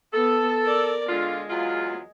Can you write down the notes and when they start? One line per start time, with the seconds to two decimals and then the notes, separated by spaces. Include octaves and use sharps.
0.14 B3 A4
0.62 A#4 D5
1.09 D3 G#3 F4
1.50 E2 F#3 F4